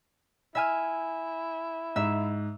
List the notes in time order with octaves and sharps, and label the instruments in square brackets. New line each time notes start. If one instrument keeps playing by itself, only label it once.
[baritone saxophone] E4 [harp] E5 G#5 F6
[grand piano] G#2 [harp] E5